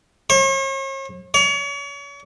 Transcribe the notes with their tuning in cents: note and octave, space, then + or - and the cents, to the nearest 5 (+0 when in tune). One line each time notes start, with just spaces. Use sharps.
C#5 -45
C#5 +35